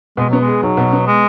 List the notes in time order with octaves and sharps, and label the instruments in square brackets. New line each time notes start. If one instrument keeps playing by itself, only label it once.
[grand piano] B2 [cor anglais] G#3
[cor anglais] F#3 [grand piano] B3
[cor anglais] G#3
[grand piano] G#4
[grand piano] B1 [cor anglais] F#3
[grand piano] B2
B3
[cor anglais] G#3